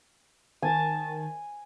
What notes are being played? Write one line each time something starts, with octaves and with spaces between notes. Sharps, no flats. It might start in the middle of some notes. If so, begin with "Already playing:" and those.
D#3 G#5 A5